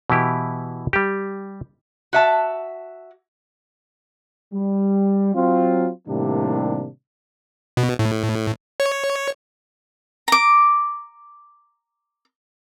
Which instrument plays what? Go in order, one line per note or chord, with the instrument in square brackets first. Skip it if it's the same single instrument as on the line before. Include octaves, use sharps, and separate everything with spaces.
[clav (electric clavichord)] B2 E3 E4 G4
G3 G4
[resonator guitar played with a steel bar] F#4 E5 A5
[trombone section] G3
F#3 C4 F4
A2 C3 D#3 G3 A#3 D4
[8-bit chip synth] B2
A2
C#5
[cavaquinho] A#5 D6